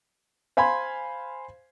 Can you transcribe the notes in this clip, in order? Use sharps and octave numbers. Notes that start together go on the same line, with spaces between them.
C5 F5 G#5 B5 C6 G#6